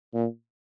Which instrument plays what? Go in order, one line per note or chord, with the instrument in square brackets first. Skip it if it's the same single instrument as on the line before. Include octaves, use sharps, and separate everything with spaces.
[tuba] A#2